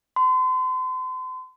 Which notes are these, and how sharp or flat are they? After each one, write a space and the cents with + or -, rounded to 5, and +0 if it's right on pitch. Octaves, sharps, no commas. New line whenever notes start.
C6 -40